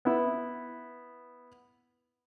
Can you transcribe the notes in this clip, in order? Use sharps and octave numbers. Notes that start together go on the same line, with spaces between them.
B3 E4